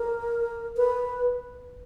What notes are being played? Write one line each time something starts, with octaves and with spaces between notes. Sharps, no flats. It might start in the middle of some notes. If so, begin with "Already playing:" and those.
Already playing: A#4
B4